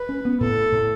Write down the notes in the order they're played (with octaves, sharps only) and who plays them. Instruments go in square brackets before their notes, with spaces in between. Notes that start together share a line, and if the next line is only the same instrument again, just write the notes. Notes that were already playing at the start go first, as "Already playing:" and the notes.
Already playing: [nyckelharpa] B4
[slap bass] C#4
B3
[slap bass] A2 [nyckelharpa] A4
[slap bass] A2